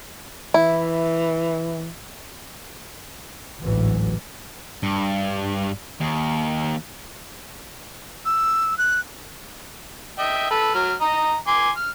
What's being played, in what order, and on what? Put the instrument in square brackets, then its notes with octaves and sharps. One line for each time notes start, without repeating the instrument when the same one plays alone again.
[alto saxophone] E3 [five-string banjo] E4
[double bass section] A1 D2 G#2 E3 F#3
[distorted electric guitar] G2
D#2
[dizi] E6
F#6
[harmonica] D#5 E5 G5
A4 B4
F#3 F6
D#5 A#5
G#5 C6 D6
F6